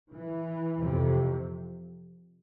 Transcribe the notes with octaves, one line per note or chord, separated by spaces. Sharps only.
E3
F2 C3